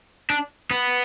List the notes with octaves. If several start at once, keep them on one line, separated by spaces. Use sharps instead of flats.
D4
B3